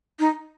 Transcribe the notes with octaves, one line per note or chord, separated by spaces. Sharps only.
D#4